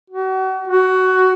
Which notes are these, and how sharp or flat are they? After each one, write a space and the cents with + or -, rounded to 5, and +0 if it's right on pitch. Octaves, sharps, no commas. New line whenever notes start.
F#4 +35
F#4 +15